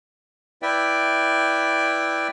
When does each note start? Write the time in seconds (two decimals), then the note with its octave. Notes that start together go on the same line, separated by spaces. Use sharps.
0.62 E4 B4 D5 E5 G5